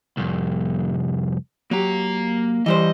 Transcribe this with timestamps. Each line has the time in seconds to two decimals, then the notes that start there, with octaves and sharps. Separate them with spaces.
0.17 C2 F2
1.71 F#3 A#3 G4 A#5
2.66 E3 G3 C5 D#5